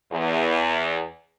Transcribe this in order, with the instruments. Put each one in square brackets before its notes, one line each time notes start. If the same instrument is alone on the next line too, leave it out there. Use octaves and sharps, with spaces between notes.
[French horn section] E2